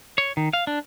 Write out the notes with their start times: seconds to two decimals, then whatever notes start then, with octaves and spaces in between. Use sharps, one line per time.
0.18 C#5
0.37 D#3
0.53 F5
0.67 D4